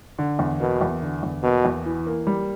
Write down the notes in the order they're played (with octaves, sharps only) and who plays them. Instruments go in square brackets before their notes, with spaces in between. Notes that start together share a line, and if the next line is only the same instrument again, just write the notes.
[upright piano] D3
E2
[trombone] B2 [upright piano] A#3
[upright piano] E2
D3
E2
[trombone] B2 [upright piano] A#3
[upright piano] E2
E3
A#3
G3